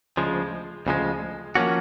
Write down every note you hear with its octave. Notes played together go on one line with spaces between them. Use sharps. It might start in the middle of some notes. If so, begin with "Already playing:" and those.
D2 C#3 F3 G#3
D2 C#3 F3 G#3
F3 A#3 C#4 F#4